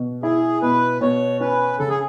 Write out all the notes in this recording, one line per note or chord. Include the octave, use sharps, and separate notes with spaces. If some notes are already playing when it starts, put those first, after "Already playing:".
Already playing: B2
E4 G#4
B2 B4
B2 C#5
C#4 B4
C#3 A4
G#4